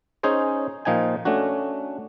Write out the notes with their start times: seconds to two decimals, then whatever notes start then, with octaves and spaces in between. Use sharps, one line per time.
0.23 C#4 D#4 G#4 C5 C#5
0.85 A#2 F3 D#4 G5 G#5
1.25 A3 C#4 D4 F#4